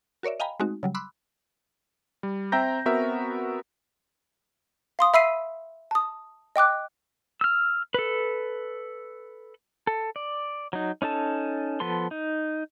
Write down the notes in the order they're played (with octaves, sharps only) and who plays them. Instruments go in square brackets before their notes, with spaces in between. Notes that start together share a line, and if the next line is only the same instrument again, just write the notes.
[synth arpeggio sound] F#4 A#4 C#5 D5 E5
D#5 F5 G5 G#5 A#5 B5
G#3 A3 C4 D#4 F#4
C#3 F#3 G3
B5 C6 D6 E6 F#6
[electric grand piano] G3
C4 E5 G5 A#5 G6 A#6
B3 C4 F#4 A#4 E5
[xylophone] F5 C6 D#6
E5 B5 E6 B6 C7 D#7
A5 D#6
D#5 G5 D6 F#6
[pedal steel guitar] E6 F6
A4 B4
A4
D5
F#3 D#4
C#4 D#4 A4 A5
F3 B3 A4 C6
D#4